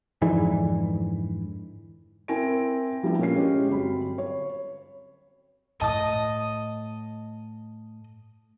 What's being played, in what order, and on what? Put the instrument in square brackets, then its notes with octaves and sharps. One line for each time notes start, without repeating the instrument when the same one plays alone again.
[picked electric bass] F2 G#2 D3 E3
[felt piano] C4 E4 A#4 G#5 A#6 D7
F3 G3 A3 B3 D4 E4
A#2 C#4 C7
G#3 C#4 G4
G1 F#3 C4 B5
C#5
[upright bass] A2 [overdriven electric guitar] D#5 [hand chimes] A5 D#6